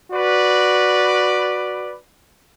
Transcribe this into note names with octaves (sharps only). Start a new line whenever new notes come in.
F#4 B4 D5